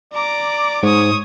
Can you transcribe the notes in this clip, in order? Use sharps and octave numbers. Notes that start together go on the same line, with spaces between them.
D5 A#5 D6
G#2 C#5 D#6